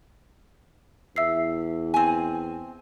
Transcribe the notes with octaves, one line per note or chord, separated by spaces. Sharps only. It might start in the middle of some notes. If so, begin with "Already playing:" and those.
E2 E5 E6 C7
C4 G#5